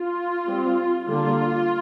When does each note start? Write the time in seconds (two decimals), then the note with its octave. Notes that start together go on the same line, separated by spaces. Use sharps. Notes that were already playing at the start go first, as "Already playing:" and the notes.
Already playing: F4
0.47 G3 C4
1.07 D3 G3 A#3 D4 F4